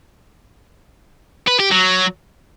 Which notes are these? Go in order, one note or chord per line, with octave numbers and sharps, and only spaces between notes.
B4
G4
F#3